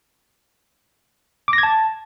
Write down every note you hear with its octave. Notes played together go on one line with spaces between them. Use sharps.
D6
A#6
G#6
A5